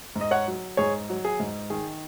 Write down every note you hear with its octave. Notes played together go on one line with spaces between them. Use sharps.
G#2
D#5
C#5 F#5
F#3
G#2 G#4 C#5
F#3
G#4
G#2
D#3 G#4